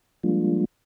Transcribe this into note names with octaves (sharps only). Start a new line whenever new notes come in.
F3 G3 G#3 A#3 D4 F4